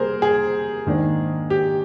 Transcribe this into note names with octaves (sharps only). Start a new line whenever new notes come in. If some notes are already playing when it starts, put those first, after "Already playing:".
Already playing: C3 G3 A#3 G#4 A#4 C5
G#4
G#2 D#3 A#3 D4
G4